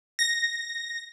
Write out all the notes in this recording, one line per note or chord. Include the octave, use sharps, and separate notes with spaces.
A#6